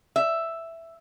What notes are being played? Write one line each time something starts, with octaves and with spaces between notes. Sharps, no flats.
E5